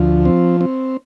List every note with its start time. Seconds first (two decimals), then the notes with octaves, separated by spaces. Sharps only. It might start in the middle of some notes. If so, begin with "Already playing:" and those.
Already playing: D2 F3
0.25 C4
0.61 C4